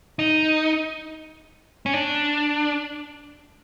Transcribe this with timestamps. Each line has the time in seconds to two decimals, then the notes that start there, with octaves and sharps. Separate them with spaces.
0.19 D#4
1.86 C#4
1.94 D4